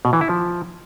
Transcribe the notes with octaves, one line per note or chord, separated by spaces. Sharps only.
B2
E3
E4
F3